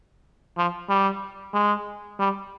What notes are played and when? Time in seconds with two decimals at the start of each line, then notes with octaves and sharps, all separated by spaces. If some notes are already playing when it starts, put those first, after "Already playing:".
0.57 F3
0.89 G3
1.54 G#3
2.19 G3